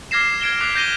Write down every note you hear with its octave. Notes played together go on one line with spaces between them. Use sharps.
D6 F6 G#6 A#6 C7 E7
G#6 C7 D7 E7 G7
D6 F#6 B6 C7 D7 F7
G6 A#6 D#7 G7